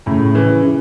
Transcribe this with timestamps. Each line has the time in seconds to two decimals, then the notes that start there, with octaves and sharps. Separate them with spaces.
0.06 A2 C#3
0.35 C#3 E3
0.63 C#3 E3